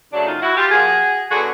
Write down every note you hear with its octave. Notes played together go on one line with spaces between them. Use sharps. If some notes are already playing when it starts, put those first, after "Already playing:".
F#2 C#3 F#3 A3 D4
D#4 F4
E4 F#4
F4 G4
A#2 F3 A#3 F#4 G#4
D3 F#3 B3 F#4 G#4